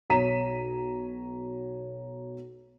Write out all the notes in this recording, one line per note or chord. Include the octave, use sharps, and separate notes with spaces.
B1 C#5 A#5 B6 D#7 E7